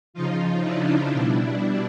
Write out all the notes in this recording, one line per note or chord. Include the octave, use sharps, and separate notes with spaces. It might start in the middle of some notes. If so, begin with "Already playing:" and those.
C#3 F3 D#4 F4
D4 E4
B2 G3